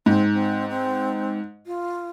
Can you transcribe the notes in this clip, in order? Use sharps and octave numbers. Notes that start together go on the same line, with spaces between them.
G#2 C4
C4
C4
F4